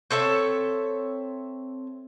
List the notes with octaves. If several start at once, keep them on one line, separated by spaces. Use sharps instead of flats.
C4 A4 C#5 E5